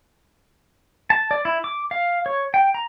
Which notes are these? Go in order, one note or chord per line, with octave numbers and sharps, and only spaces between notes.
A5
D5
E4
D6
F5
C#5
G5
A#5